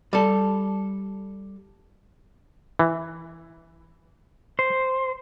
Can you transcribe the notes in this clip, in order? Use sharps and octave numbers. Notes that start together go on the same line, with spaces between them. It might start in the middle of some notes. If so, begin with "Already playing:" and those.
G3 A4
E3
C5